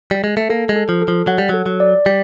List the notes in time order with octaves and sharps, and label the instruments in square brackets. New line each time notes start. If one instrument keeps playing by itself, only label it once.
[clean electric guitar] G3
G#3
A3
[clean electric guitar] A#3 [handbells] A4
[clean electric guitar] G#3
[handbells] A4
[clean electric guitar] F3
[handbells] A4
[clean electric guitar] F3
[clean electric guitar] F#3 [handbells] F#5
[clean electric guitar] G3
[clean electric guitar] F#3 [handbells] A4
[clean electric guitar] F#3
[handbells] D5
[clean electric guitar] G3 [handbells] D5